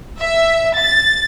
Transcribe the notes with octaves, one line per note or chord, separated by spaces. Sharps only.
E5
A6